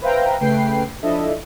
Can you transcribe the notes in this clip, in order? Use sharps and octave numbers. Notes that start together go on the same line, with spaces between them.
B4 C5 E5 F5 G5 A#5
C#3 A3 B4 G5 C7
F3 D4 E4 A4 D#5 E5